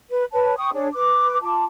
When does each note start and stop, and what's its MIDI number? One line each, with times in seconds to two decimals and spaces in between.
0.11 0.24 71
0.33 0.55 71
0.33 0.55 73
0.33 0.55 81
0.57 0.71 79
0.57 0.71 85
0.57 0.71 87
0.74 0.88 62
0.74 0.88 68
0.74 0.88 73
0.93 1.40 71
0.93 1.40 86
1.42 1.65 65
1.42 1.65 81
1.42 1.65 86